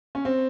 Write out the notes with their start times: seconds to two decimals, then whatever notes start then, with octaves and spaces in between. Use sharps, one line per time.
0.15 C#4
0.25 C4